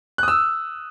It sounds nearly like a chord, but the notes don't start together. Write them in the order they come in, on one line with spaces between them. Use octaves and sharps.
F#6 D#6 E6